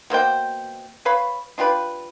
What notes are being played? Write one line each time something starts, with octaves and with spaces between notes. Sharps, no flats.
B2 A#3 C5 G5
B4 C#5 F5 B5
D4 F4 G4 B4